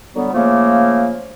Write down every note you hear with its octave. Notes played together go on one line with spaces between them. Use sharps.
D3 F#3 G3 B3
C#3 F3 A3 A#3